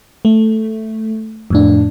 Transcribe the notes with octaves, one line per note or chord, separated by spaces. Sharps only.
A3
F2 A2 D4